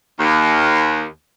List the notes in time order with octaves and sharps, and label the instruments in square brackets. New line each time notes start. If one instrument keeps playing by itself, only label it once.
[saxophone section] D#2